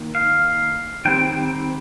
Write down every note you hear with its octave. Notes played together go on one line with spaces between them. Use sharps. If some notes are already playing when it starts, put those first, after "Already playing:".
Already playing: D#3 A#3
F5
D#3 G3 C4 G5